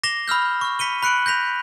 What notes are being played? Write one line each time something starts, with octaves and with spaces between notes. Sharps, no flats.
D6 A#6 C7 E7 F7 G7
B5 E6 F6 G6
C#6 F6
B5 B6 C#7 D#7 G7
B5 F#6 C#7 D7 F#7
G6 A#6 B6 F7